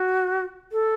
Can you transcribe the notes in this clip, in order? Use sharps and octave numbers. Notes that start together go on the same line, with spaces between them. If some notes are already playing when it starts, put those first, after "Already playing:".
Already playing: F#4
A4